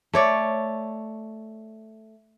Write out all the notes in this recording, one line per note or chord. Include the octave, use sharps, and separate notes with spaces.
A3 C#5 D5